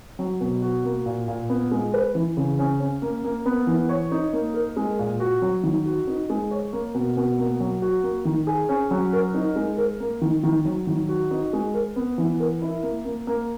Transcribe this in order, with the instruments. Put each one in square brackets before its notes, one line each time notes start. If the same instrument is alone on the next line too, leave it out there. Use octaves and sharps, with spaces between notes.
[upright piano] F#3
B2
F#4
A#3
A#2
A#2
B3
G#3
B4
E3
C#3
C#4
C#4
A#3
A#3
B3
E3
C#5
D#4
A#3
A#4
G#3
A#2
F#4
F#3
D#3
F#4
D#4
G#3
C#5
A#3
B2
B2
A#3
F#3
F#4
A#3
D#3
G#4
C#4
F#3
A#4
D#4
G#3
A#4
A#3
D#3
D#3
F#3
D#3
F#4
D#4
G#3
A#4
B3
E3
A#4
E4
A#3
A#3
A#3